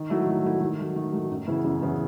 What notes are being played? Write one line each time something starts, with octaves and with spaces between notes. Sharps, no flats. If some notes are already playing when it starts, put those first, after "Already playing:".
Already playing: D#3
F#3 A3 E4
D#3
F#3 A3 E4
D#3
F#3 A3
D#3
F#3 A3
F#2
C#3 E3 B3 E4
F#2
C#3 E3 B3 E4